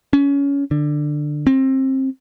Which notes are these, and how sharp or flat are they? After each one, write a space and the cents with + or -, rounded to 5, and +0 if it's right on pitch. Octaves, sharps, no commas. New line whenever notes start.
C#4 +20
D3 +15
C4 +25